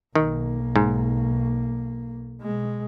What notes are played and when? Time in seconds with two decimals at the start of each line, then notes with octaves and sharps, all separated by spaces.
0.15 B1 D#3 A#3
0.76 G#2
2.42 B2 G#3